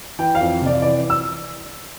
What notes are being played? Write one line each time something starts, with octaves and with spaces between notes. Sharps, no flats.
E3 G5
F5
F2
C3 D5
E3 D5
E6